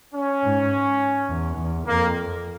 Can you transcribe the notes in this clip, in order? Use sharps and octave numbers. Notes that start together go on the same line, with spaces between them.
C#4
G#2
E2
E2
F2 A#3